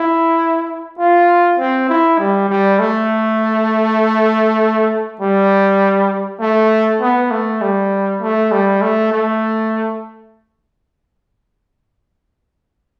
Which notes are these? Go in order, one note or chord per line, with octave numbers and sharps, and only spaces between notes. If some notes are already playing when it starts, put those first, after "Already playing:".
Already playing: E4
F4
C4
E4
G3
G3
A3
G3
A3
B3
A3
G3
A3
G3
A3
A3